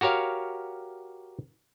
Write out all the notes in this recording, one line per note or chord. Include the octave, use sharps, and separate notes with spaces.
F#4 G4 A#4 C#5 F5